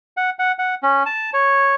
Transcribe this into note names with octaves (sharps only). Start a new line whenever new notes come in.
F#5
F#5
F#5
C#4
A5
C#5